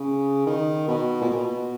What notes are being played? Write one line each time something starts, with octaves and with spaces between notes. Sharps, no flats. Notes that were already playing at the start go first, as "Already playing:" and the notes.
Already playing: C#3
D#3
B2
A#2
B2